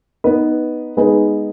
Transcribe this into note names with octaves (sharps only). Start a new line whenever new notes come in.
B3 D#4 B4
G#3 B3 D#4 G#4 B4